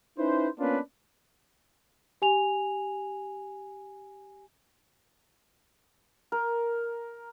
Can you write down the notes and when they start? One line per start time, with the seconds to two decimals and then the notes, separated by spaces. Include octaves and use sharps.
0.18 C#4 D#4 E4 B4 C5
0.59 A#3 B3 C#4 D4 F4 B4
2.22 G4 G#5 F7
6.32 A#4